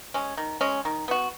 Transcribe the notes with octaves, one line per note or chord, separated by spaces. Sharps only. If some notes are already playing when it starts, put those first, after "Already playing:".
G#3 C#4
D#3
G#3 C#4
D#3
B3 F#4